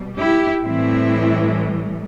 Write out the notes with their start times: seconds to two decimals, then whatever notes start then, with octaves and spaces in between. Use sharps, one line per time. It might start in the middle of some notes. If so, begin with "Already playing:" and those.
Already playing: B2 G3
0.19 E4 G4
0.63 A2 E3 G3 C4 E4